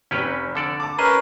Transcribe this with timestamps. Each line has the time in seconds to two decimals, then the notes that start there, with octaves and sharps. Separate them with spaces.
0.11 F1 C#4 G4 B4
0.55 D3 A4 D5
0.80 A5 D6
0.99 C#4 G#4 A#4 B4 D#5 E5 A#5